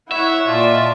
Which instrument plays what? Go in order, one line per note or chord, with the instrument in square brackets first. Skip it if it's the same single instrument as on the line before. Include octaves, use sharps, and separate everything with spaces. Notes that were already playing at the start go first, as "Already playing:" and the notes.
[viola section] E4 C#5 F#5 [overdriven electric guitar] E5
[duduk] A#2 [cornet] F4 [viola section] D5 D#5 A5